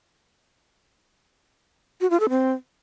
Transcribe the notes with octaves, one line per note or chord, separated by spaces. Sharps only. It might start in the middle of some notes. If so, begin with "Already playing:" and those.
F#4
F4
A4
C4